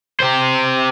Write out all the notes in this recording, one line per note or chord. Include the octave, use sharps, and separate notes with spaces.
G4 C5